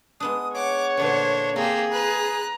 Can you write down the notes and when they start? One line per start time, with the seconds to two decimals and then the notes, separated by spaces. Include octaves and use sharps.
0.20 G#3 B3 D4 D#6
0.55 C#5 F#5 D6
0.97 A#2 D3 E3 D4 C5
1.56 A#3 C4 G4 G#4
1.92 B4 A#5 F#6